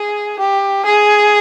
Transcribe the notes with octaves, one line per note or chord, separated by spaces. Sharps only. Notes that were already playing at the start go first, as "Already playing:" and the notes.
Already playing: G#4
G4
G#4